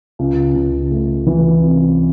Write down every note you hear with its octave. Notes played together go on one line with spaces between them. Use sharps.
C#2
C#2
A3
E3
C3